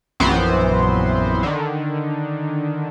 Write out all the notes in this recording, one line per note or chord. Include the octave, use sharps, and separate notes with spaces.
A#1 F#2 E3 B3 C4 C5
D3 D#3